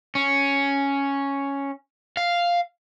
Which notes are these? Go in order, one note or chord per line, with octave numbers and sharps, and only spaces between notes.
C#4
F5